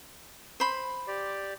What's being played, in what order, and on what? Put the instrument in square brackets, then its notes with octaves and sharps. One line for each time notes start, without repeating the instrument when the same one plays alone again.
[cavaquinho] C5 B5 C6
[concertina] G4 D5